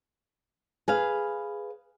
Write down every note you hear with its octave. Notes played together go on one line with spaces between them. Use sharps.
G#4 B4 F5